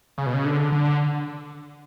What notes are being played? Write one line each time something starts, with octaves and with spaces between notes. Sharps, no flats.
C#3
B2
C#3
D3
D3